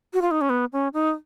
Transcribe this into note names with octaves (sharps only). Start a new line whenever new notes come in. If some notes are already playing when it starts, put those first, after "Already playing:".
F#4
F4
D#4
C#4
B3
C#4
D#4